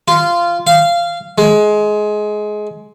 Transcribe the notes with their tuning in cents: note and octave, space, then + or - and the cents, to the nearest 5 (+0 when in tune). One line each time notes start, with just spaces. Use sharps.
F4 -15
F5 -15
G#3 +20